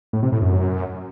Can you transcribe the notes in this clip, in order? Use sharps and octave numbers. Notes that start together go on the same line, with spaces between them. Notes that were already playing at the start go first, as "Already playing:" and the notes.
A2
C3
A2
F#2